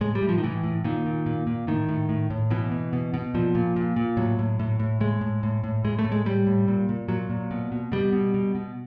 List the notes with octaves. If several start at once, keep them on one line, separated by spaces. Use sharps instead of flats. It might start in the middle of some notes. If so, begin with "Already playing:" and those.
A2 G#3
G3
A2
F3
D#3
A2 E3
A2
A#2 D#3
A#2
A#2
A#2
A2 D#3
A2
A2
A2
B2 E3
B2
B2
B2
A#2 F3
A#2
A#2
A#2
A2 F#3
A2
A2
A2
A2 G#3
A2
A2
A2
A2 G#3
A3
A2
G#3
A2 G3
A2
A#2
A#2
A#2 F#3
A#2
B2
B2
B2 G3
B2
B2
B2